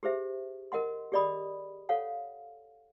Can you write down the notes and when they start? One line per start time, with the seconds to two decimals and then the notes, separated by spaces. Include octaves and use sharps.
0.03 G4 G#4 C5 E5
0.72 A#4 D#5 F#5 C6
1.12 G4 G#4 D5 D#5 B5 D#6
1.89 A4 C#5 F5 F#5